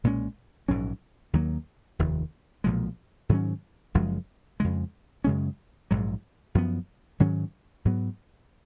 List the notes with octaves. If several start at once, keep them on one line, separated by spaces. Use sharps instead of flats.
B1 A#2 G#3 C#4
A#1 G#2 F#3 C#4
D#2 D#3 F#3 A#3
F1 D#2 D#3
B1 A#2 F3 G#3
G#2 D#3 F#3 C#4
F#1 F#2 F3 G#3
F2 C#3 G#3
F#2 C#3 G#3 C#4
A#1 G#2 F#3
F#2 F3 B3
G#2 D#3 F#3 C#4
G#2 F#3 B3